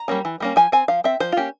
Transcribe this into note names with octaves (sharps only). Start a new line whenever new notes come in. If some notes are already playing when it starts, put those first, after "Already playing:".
Already playing: A#5
G3 A#3 C#4
E3
G3 A#3 C#4
F3 G#5
C4 G#5
F3 F5
C4 E5
F3 C5
F4
A#3 C#4 G4